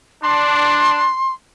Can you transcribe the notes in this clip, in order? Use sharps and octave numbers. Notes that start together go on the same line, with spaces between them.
D4 C6